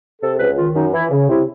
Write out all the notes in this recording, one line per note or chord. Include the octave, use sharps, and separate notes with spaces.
C3 A4
C#2 B4
D#3 F4
F#2 D#4
E3 E4
C#3
C3 E4